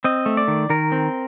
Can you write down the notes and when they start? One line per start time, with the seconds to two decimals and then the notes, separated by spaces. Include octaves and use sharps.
0.04 C4 D#5
0.26 A3
0.37 D5
0.48 D#3
0.70 D#3 A#4
0.92 C4